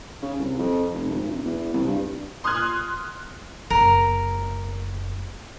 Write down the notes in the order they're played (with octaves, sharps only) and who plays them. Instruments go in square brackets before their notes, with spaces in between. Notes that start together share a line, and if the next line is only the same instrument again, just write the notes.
[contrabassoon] C#3
C2
F2
F1
G#1
E1
E2
C2
G2
[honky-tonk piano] C6 D#6 F6 F#6 G#6
[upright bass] F#1 [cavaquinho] A#4